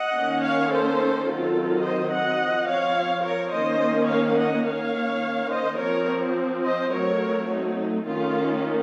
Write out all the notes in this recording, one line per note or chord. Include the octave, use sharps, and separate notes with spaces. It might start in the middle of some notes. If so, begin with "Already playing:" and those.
Already playing: D#5 F#5
D#3 A#3 C#4
C#5 F5
A4 C5
D#3 F#3 C4 F4 A4
C5 D#5
D#5 F#5
F3 C4
C#5 F5
A#4 C#5
D#3 A#3 C#4 C5 D#5
C#5 F5
D#5 F#5
D#3 A#3 C#4 C#5 F5
C5 D#5
F3 C4 A#4 C#5
C5 D#5
F#3 A3 C4 A#4 C#5
D#4
D#3 A3 C#4 F4